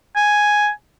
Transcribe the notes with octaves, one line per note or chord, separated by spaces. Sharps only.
G#5